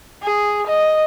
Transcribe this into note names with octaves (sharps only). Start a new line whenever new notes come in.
G#4
D#5